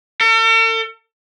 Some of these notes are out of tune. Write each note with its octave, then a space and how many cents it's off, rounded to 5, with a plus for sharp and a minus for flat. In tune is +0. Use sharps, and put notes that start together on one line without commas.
A4 +45